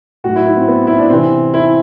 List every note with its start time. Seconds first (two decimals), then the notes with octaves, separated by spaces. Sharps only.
0.24 A2 F#3 F#4
0.36 E4
0.46 E4
0.57 C4
0.68 B3
0.87 E4
0.98 D4
1.10 C3 E3 C4
1.54 E4